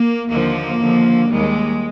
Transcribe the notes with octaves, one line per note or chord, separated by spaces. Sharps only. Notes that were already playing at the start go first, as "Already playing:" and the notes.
Already playing: A#3
D#2 D3 F3 A#3
D#2 D3 F3
D#2 D#3 G3 G#3